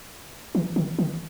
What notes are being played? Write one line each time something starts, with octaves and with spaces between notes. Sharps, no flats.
E3
D#3
D#3